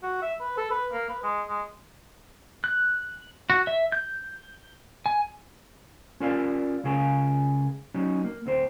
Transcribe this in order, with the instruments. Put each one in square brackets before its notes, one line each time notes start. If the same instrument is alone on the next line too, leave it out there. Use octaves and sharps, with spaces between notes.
[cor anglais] F#4
E5
B4
A4
B4
A#3
B4
G#3
G#3
[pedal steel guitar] F#6
F#4
E5
G6
G#5
[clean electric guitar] C#4 F4 A#4 D5 F5
C#2 C#3 C#4 G#4 A#4
F#3 C#4 D#4
A#3
D2 C4 C5